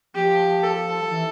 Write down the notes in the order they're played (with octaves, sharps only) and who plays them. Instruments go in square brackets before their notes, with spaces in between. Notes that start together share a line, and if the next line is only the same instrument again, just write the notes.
[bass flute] F3 [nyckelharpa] G4
[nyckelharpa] A4
[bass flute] E3